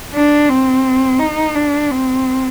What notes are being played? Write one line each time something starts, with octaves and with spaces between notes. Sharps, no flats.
D4
C4
D#4
D4
C4